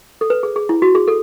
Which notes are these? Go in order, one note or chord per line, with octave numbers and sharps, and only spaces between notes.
A4
B4
G#4
G#4
E4
F#4
G#4
A4